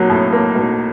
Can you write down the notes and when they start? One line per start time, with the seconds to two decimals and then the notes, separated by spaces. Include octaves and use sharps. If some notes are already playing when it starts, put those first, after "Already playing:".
Already playing: B1 F#3 A#3
0.09 A2
0.33 A#3
0.55 B1